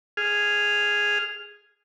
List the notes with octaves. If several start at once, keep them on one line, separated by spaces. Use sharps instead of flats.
G#4 F6